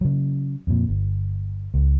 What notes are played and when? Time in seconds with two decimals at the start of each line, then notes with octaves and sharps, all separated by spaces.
0.01 C#3 F#3
0.67 F2 A#2
0.89 G1
1.74 C#2